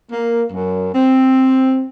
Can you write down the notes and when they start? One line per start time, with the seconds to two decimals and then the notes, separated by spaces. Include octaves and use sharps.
0.12 A#3
0.52 F#2
0.94 C4